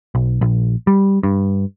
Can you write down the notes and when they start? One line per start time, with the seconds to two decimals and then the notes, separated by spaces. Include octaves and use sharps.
0.15 B1
0.41 A#1
0.87 G3
1.23 G2